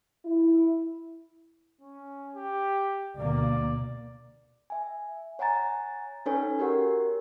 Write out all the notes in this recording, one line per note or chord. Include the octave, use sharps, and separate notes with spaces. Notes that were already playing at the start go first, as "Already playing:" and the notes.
E4
C#4
G4
D2 B2 A#3 D5
E5 G#5
C#5 F#5 G#5 A#5 A6
C#4 D#4 A4 B4 C#5 G#5
F#4 G4 A#4 C#5 F#5